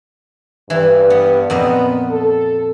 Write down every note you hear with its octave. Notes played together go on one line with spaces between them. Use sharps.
G2 E3
B3
F2 A#2 B3 D#5
A4